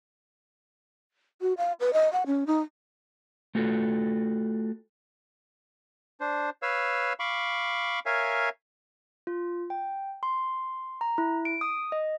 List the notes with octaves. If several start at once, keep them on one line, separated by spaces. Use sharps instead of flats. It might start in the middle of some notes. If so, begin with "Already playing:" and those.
F#4
F5
B4
D#5
F#5
C#4
D#4
A3 F4 F#4 A4
D4 C5
B4 C#5 F5 E6
F5 B5 C#6 D6
A#4 C#5 E5 F5 G#5
F4
G5
C6
A#5
E4
D7
D#6
D#5